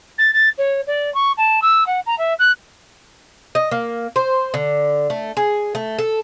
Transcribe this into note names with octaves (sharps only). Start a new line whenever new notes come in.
A6
A6
C#5
D5
C#6
A5
E6
F#5
A#5
E5
F#6
D#5
A#3
C5
D3
A3
G#4
A3
A4